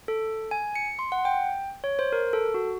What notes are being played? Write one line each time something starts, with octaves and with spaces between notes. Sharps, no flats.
A4
G#5
C#7
C6
F#5
G5
C#5
C5
A#4
A4
F#4